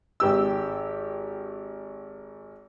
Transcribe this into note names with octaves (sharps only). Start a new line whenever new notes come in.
G#1 G4 E6